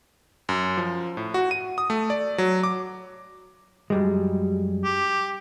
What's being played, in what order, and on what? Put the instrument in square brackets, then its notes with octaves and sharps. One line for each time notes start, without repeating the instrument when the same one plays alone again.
[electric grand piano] F#2
F3
A2
F#4
D#7
D#6
A3
D5
F#3
D6
[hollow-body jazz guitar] F#2 G3 G#3
[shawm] G4